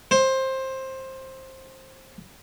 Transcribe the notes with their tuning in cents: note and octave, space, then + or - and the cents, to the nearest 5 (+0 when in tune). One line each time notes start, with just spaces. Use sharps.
C5 +15